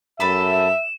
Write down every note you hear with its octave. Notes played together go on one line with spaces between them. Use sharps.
F#2 A4 B4 E5 B5 E7